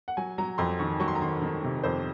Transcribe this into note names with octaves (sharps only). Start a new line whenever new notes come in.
F#5
F#3 G#5
F#3 A#5
F2 C6
D#3 C#6
F#3 C#6
C6
A#5
D#3 C6
D#3
C3
F2 C5